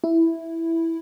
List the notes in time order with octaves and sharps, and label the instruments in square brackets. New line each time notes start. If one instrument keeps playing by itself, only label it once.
[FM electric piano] E4